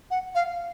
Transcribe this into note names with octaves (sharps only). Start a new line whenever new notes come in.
F#5
F5